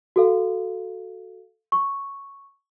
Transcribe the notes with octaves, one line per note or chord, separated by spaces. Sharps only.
F#4 A4 F5
C#6